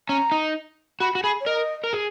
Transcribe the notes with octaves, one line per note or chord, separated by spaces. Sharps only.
C#4 A#5
D#4
F#4 B5
F#4
G#4 B5
C#5
A#4 D#5
A#4
G#4